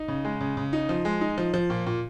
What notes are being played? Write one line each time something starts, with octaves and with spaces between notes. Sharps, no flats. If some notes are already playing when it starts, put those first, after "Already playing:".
Already playing: D#4
C#3
G#3
C#3
C#3
D#4
F3
G#3
D#4
F3
F3
A#2
A#2